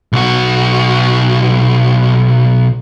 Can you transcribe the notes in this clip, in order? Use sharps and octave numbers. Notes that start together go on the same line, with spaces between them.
B1 F#4